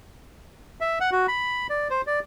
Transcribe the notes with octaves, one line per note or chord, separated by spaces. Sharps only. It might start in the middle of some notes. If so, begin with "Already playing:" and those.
E5
F#5
F#4
B5
D5
C5
D5